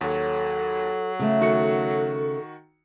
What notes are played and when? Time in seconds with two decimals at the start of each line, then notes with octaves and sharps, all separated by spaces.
0.01 D#2 F#3 A4 C#5
1.19 C#3 A3
1.40 D#3 F#4 A4 C#7